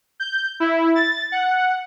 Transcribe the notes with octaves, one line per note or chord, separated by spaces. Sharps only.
G6
E4
A6
F#5